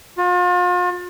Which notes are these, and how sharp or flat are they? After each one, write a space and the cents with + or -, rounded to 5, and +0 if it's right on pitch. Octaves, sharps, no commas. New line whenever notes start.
F4 +40